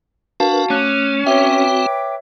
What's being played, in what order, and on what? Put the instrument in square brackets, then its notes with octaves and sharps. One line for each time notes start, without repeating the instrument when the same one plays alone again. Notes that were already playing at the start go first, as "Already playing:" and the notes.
[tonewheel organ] D4 A#4 B4 [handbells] F#4 F5 A5
[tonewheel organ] A3 [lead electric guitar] C#4 [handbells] D6 F#6
[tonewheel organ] C4 F#4 [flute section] B4 G5 D6 [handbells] C#5 E5